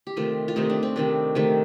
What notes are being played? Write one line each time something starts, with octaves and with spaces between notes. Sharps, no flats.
G4
C3 D#3 A3 F4
F4
C3 D#3 A3 D#4
D4
C4
C3 D#3 A3 D4
C3 D#3 A3